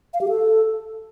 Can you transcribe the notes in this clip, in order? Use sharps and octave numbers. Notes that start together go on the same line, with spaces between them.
F5
G4
A4